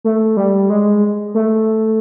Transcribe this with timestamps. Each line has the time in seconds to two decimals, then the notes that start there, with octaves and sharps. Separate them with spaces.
0.04 A3
0.37 G3
0.70 G#3
1.35 A3